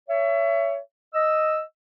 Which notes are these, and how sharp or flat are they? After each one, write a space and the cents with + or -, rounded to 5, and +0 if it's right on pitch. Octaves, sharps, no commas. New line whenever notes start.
C#5 +20 E5 +25
D#5 +0 E6 +0